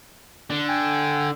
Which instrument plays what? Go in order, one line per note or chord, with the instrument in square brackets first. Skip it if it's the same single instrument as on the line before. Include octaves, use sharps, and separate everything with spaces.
[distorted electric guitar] D3
[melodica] G5 G#5